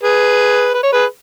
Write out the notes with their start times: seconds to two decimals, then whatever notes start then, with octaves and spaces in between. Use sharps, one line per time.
0.03 G#4 B4
0.74 B4
0.83 C#5
0.93 G#4 B4